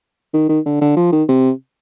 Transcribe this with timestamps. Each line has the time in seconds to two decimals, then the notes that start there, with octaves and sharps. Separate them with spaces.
0.34 D#3
0.49 D#3
0.66 D3
0.81 D3
0.97 F3
1.12 D#3
1.28 C3